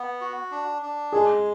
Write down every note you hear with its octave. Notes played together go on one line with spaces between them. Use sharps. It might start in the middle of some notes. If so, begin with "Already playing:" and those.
Already playing: B3
F#4
D4
D4
G#3 G#4